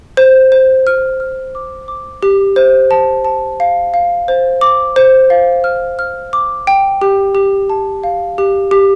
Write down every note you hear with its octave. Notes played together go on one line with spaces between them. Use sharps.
C5
C5
F6
F6
D6
D6
G4
C5
A5
A5
F5
F5
C5
D6
C5
F5
F6
F6
D6
G5
G4
G4
A5
F5
G4
G4